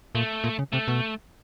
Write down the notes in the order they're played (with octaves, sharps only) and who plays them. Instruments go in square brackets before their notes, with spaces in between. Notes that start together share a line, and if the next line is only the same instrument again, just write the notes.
[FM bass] A#2 [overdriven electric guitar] A3
[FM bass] A#2
C#3
[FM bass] C3 [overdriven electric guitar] A3
[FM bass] B2